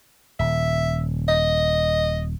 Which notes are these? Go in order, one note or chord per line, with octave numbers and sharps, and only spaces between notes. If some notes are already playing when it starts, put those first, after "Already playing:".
D#1 E5
D#5